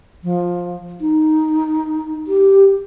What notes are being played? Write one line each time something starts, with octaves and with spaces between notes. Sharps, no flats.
F3
D#4
G4